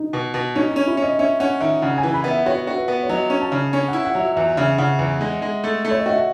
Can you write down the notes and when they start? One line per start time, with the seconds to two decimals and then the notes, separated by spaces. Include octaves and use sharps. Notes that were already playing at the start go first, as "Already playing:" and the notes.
Already playing: D#4
0.13 B2
0.34 B2
0.55 C#4 D#4
0.71 C#4 D#4
0.87 E4
0.97 C#4
1.02 D#5
1.19 C#4 E5
1.40 C#4 F#5
1.60 D#3 E5
1.82 C#3 F#5
1.98 G#5
2.03 E3
2.14 B5
2.24 B3
2.30 E5
2.46 F#4 C#5
2.67 F#4
2.77 B4
2.88 B3
3.03 C#5
3.09 F#3 D#5
3.30 C#4
3.41 A5
3.52 C#3
3.72 C#4 G#5
3.88 E4 F#5
4.05 F#5
4.15 F#3
4.20 E5
4.36 E2 E5
4.57 C#3 E5
4.78 C#3 F#5
4.99 E2
5.21 G#3
5.42 G#3
5.64 A3
5.85 A3
5.91 C#5
5.99 D#5
6.06 F#4 E5
6.17 F#5